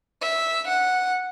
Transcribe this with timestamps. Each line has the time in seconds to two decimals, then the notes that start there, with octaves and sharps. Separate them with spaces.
0.22 E5
0.68 F#5